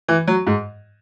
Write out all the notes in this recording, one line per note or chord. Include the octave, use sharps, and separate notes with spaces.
E3
F#3
G#2